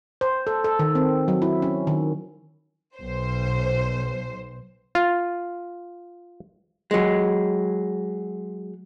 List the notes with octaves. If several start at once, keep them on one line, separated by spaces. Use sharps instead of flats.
C5
A4
A4
D#3
C4
F#3
E4
C#4
D#3
B1 C5
F4
F#3 G#3